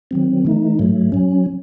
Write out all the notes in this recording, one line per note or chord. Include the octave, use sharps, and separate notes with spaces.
D#3 F#3 C4
E3 A3 D#4
G#2 F#3 A3
F#3 C#4